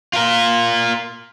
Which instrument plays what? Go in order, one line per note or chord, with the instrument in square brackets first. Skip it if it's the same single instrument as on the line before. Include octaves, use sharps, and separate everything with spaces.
[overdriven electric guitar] F4 A#4